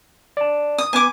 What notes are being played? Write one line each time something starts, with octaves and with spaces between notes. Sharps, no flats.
D5 A5
D#6
B3 B4 G#5 D6